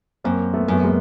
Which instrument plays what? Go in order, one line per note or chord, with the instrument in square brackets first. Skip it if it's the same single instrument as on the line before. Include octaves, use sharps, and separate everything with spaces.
[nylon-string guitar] F#2 [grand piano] A#3 C4
[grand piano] A3 B3
[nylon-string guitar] F#2 [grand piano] B3
[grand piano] G#3 A#3